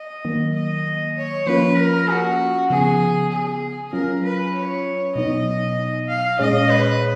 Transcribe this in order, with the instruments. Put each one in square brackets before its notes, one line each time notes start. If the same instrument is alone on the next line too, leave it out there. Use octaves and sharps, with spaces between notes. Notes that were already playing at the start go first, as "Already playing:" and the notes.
Already playing: [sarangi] D#5
[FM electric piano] D#3 F#3 A#3
[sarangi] D#5
C#5
[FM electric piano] F3 A#3 C#4 F4 [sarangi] B4
[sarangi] A#4
F#4
[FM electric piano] C#3 F3 B3 [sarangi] G#4
[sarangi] G#4
[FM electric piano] F#3 C#4 F4 [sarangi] A#4
[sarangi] B4
C#5
[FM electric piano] B2 F#3 B3 D#4 [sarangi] D#5
[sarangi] F5
[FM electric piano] A#2 G#3 C#4 G#4 C#5 [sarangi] D#5
[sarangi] B4